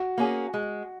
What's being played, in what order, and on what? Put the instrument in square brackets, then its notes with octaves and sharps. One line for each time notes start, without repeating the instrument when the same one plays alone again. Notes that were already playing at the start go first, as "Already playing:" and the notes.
Already playing: [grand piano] F#4
[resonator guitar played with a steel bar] A#3 C#4 G#4
G#3